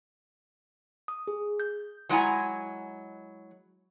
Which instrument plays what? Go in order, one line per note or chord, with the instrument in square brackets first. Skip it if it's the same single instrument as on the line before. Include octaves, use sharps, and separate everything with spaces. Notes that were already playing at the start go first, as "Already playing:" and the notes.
[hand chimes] D#6
G#4
G6
[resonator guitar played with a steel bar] F#3 G#3 E4 F#5 G#5 A#5